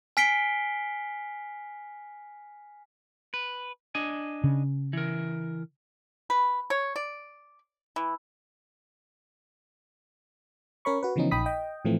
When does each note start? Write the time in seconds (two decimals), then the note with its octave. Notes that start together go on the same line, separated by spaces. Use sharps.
0.17 G#5 F6 B6 C7 D7 G7
3.34 B4
3.95 D4 D#5 G#5
4.44 C#3
4.93 E3 A#4
6.30 B4
6.70 C#5
6.96 D5
7.96 E3
10.85 C#4 A#4 C#5 B5 C#6
11.03 F#4 B4
11.16 C#3 E3 F3 B3 C#4 D#4
11.31 A#1 D#4 G5 B5 D#6 B6
11.46 D#5 G5
11.85 A2 E3 F3 A3 C4